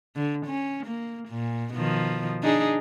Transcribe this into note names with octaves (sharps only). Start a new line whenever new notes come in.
D3
C#4
A#3
A#2
B2 D#3 F3
D4 D#4 G#4